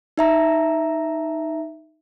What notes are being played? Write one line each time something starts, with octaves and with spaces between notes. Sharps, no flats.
D#4 E5 A#5